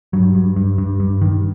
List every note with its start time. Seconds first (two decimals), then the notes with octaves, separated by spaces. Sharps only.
0.13 G2 F#3
0.35 G2
0.57 G2
0.78 G2
1.00 G2
1.22 G2 D#3